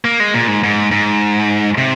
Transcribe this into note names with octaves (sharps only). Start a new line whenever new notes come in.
A#3
G#3
A#2
G#2
G#2
G#2
C3